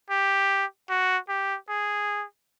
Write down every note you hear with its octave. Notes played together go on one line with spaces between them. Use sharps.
G4
F#4
G4
G#4